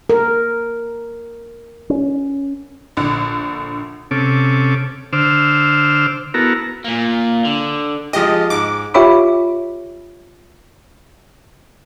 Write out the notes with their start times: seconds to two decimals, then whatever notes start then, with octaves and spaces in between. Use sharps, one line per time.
0.10 A#4
1.90 C#4
2.97 A#1 D3
4.11 C3 C#4 A4 D6
5.13 D3 C5 D6 E6 F6
6.34 B3 E4 F#4 A4 A#4 A#5
6.84 A#2 A#3
7.45 D3
8.13 F3 G#3 G4 D#5
8.50 G#2 D6
8.94 F4 G4 C#5 E5 B5 D6